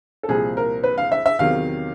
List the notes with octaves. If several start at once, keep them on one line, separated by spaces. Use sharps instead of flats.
A4
C2 A#2 F3 G#4
A#4
B4
F5
E5
E5
E2 C3 D#3 F#3 F5